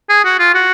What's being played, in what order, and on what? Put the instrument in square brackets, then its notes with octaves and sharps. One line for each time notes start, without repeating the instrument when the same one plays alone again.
[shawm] G#4
F#4
F4
F#4